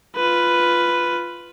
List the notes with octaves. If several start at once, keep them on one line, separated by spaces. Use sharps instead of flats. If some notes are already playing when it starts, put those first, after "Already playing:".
F4 B4